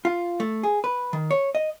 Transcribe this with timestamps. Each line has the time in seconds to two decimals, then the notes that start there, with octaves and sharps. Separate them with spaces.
0.05 F4
0.40 A3
0.63 G#4
0.84 B4
1.13 D#3
1.31 C#5
1.55 D#5